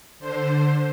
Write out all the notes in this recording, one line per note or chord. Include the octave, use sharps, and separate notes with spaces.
D3 C5